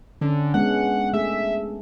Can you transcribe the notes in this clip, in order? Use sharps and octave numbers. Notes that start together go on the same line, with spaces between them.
D3 C#4 D4
G#3 B3 C#4 F#5
A3 G#4 E5